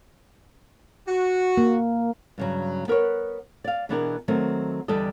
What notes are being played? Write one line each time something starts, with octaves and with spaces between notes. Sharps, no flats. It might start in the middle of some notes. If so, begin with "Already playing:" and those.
F#4
A#3
G2 C#3 F#3
B3 A#4 B4 C#5
D5 F5
B2 E3 B3 D4 G#4 A#4
D#3 F#3 A3 C4
E2 D3 G3 D4 A4 D#5